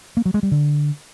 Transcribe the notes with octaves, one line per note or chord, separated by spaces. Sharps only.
A#3
F#3
G#3
G3
D3